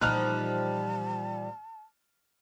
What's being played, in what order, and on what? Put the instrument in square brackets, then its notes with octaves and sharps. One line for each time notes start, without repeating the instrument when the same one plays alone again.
[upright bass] A#2 E3 [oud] F3 G3 D#4 [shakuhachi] A5 [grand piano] F6 F#6